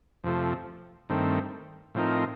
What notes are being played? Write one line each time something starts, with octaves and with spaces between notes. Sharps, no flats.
F2 C3 F3 A3
G2 D#3 A3 C4
A2 F3 C4 D#4 A#4